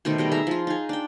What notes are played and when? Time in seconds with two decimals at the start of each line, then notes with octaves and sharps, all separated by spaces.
0.05 B2 D#3 A3 C5
0.18 B2 G3 D#5
0.32 G#4 E5 A#5
0.47 F3 F4
0.67 D#4 G#4
0.89 D4 G5